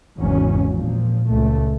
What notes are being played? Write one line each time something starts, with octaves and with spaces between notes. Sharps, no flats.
G#1 E2 G#2 C#3 F#3 C#4
A#2 F3
C#2 A3